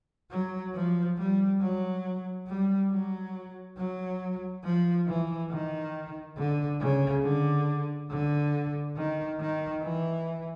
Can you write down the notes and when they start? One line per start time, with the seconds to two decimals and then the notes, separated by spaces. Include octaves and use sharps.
0.31 F#3
0.74 F3
1.17 G3
1.61 F#3
2.47 G3
2.91 F#3
3.77 F#3
4.63 F3
5.07 E3
5.50 D#3
6.37 D3
6.80 C#3
7.23 D3
8.10 D3
8.96 D#3
9.40 D#3
9.83 E3